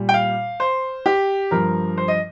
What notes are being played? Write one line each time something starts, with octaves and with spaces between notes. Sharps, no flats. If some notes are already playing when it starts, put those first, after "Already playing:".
Already playing: A#2 G3
G5
F5
C5
G4
G2 F3 A#4
C5
D#5